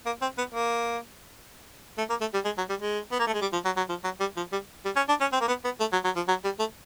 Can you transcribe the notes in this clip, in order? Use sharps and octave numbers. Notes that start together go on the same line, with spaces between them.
A#3
C4
B3
A#3
A3
A#3
A3
G3
G#3
F#3
G3
G#3
B3
A#3
A3
G#3
G3
F3
F#3
F#3
F3
F#3
G3
F3
G3
G3
C#4
D4
C#4
C4
A#3
B3
B3
A3
F#3
F#3
F3
F#3
G3
A3